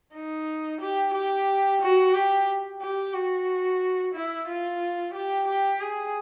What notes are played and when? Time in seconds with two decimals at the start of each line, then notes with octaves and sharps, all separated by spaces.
0.14 D#4
0.81 G4
1.14 G4
1.81 F#4
2.14 G4
2.81 G4
3.14 F#4
4.14 E4
4.48 F4
5.14 G4
5.47 G4
5.81 G#4